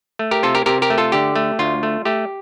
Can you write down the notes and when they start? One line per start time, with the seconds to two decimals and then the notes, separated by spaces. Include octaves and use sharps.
0.19 A3
0.31 G4 A#4
0.43 C3 F4 A4
0.55 G4 A#4
0.66 C3 G4 A#4
0.82 G4 A#4
0.90 A3
0.98 F4 A4
1.12 D3 G4
1.36 A3
1.59 D2 F4
1.83 A3
2.05 A3 G4